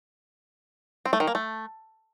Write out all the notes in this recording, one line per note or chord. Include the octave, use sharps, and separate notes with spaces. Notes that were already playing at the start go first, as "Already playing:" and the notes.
C4
A3
D#3
A#3
A3